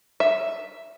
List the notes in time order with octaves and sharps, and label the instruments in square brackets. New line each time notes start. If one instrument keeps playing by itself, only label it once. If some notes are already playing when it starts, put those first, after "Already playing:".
[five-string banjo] E5